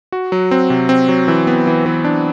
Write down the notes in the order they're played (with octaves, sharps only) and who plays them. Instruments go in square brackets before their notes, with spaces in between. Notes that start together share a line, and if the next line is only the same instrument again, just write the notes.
[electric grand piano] F#4
F#3
C4
C3
C4
F#3
E3
B3
E3
E3
D4